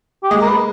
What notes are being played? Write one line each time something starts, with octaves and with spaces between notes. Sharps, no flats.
G4
G#3 G#4
A#4
G#3 B4